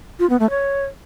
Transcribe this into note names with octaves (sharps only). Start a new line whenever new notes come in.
F4
B3
A3
C#5